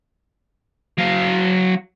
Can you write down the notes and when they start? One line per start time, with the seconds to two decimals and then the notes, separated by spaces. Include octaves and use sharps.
0.98 F#3 F5